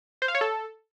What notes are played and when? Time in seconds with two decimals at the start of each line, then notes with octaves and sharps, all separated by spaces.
0.22 C5
0.28 F5
0.35 C#5
0.41 A4